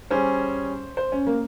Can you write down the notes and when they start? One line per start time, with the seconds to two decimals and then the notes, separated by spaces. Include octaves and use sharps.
0.11 G3 C#4 G#4 C5
0.97 C5
1.12 C#4
1.27 A#3